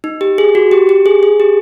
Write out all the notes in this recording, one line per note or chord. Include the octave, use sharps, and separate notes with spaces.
D#4
G4
G#4
F#4
G4
G4
G#4
G#4
G4